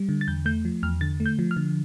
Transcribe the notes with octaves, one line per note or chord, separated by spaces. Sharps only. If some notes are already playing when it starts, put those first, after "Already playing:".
Already playing: G3
D3
A6
E2 G6
A3 G6
F3
E2 F6
D3 A6
A3
G6
F3
F6
D3